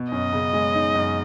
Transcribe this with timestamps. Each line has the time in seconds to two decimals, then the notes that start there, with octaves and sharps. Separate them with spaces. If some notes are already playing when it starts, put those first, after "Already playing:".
Already playing: B2
0.12 F#2 D#5
0.33 C#3
0.53 G#3
0.75 D#4
0.95 F#2